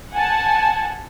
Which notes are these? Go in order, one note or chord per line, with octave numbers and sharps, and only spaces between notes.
F#5 G#5 A5